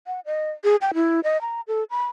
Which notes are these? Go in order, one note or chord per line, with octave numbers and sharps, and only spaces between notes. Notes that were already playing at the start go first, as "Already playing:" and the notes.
F#5
D#5
G#4
G5
E4
D#5
A#5
A4
B5